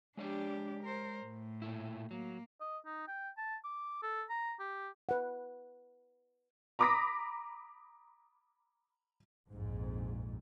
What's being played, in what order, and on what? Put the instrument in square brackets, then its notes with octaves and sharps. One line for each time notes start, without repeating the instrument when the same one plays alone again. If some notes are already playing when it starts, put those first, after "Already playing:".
[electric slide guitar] G#3 C#5 D5 [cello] D4 G4
[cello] A#4 C5
A2
[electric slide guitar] A#2 A3 E4
[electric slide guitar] F#3 [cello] A#3
[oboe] D#5
D#4
G5
A5
D6
A4
A#5
G4
[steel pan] B4 F#5
[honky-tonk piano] A#5 B5 D6 D#6 A#6 B6
[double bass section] A#1 F2 G#2